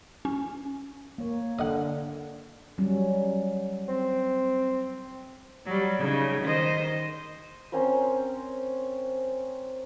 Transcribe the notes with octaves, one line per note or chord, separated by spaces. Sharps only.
C#4
A#3 C#5
D3 D#5 F#5
F#3 G3 C#4
C4
F#3 G3
C#3 D#4
D#3 C5 D#5
C4 C#4 A#4 C5